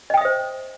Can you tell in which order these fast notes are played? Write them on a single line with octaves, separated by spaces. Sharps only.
D#5 G5 D#6 E5 C5